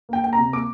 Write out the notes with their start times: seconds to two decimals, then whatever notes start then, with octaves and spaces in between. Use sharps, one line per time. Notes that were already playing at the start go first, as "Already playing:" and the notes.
0.09 A#3 G5
0.23 A#3 G5
0.33 A#5
0.38 C3
0.52 A#3 D6